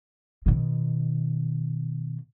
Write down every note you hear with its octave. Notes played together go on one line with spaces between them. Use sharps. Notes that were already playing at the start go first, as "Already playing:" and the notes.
B2 D#3